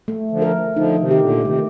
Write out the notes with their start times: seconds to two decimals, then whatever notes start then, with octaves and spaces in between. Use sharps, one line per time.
0.08 A3
0.31 D3 F3
0.42 A#4
0.76 D3 F3 D#4
0.99 C3 D#3
1.11 G4
1.21 A#2 D3
1.44 C3 D#3 A3